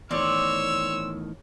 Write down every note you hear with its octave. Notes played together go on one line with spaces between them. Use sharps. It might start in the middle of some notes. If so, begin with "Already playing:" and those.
E2 A2 D#3 C4 C#5 D5 E6